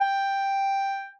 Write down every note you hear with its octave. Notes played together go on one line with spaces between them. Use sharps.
G5